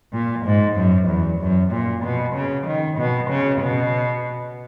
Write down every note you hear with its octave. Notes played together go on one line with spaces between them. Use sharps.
A#2
G#2
F#2
E2
F#2
A#2
B2
C#3
D#3
B2
C#3
B2